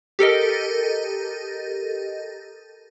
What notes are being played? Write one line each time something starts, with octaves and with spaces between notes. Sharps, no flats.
G4 A4 A#4 D#5